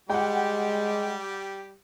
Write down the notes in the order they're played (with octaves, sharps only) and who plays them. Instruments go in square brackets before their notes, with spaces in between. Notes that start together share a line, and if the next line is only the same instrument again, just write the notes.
[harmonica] G3 G4 [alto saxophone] G#3 [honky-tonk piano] F#5 G5